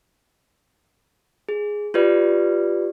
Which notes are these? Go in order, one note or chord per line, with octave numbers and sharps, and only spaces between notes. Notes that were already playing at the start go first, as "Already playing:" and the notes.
G#4
F4 G4 B4 D5